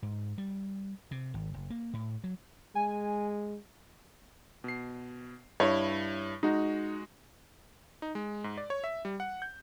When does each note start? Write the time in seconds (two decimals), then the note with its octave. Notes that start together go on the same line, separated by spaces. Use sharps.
0.02 G#2
0.38 G3
1.11 C3
1.34 G#1
1.54 F#1
1.70 A#3
1.93 A2
2.24 F#3
2.75 G#3 G#5
4.64 B2 C7
5.60 G2 E4 C#5
6.43 G#3 D#4 F#4
8.02 D#4
8.15 G#3
8.44 G#2
8.58 D5
8.70 C#5
8.84 E5
9.05 G3
9.20 F#5
9.42 G6